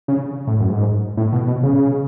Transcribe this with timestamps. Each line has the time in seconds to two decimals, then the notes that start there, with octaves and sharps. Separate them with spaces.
0.08 C#3
0.47 A2
0.60 F#2
0.70 G#2
1.17 A2
1.33 B2
1.48 B2
1.63 C#3